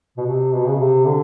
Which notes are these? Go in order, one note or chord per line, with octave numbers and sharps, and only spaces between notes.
B2
C3
B2
C#3
C3
D3